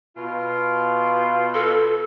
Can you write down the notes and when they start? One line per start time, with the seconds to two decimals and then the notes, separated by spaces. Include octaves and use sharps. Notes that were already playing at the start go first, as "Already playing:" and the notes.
0.16 B2 F4
1.54 A4